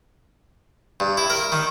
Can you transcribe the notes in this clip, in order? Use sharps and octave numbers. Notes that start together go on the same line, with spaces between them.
G2
E4
A#4
D#3